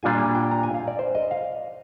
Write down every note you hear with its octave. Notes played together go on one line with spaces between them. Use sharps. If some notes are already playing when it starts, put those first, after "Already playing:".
A#2 G3 D4 F4 G#5
G#5
G5
A#5
G#5
F5
D5
C5
D#5
F5